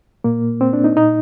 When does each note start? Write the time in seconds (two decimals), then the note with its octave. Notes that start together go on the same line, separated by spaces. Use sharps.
0.24 A#2 A#3
0.61 C4
0.73 D4
0.84 D#4
0.97 A#2 D#4